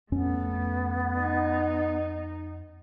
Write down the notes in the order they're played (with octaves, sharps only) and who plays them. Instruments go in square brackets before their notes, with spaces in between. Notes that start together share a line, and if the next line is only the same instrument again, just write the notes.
[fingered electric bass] F2 C#4 [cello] A3 [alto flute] B3
[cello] D#4